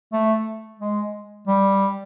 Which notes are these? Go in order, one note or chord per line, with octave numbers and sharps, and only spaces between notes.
A3
G#3
G3